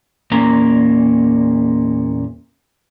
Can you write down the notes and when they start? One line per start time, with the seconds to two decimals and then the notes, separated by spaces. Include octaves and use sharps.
0.31 E2 A#2 A#3 C#4 A#4 A#5